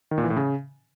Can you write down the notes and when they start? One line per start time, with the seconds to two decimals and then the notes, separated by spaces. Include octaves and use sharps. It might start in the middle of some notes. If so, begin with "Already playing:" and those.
0.11 D#3
0.18 A#2
0.24 E3
0.30 A2
0.36 C#3